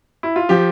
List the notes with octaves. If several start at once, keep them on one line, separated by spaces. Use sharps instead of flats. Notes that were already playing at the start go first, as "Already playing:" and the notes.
E4
F4
F3 G4